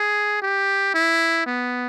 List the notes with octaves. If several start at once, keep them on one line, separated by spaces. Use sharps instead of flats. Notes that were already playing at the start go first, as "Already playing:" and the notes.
Already playing: G#4
G4
E4
B3